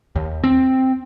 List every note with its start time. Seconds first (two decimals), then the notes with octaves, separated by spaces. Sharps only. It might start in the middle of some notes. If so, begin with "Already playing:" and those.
0.16 D#2
0.44 C4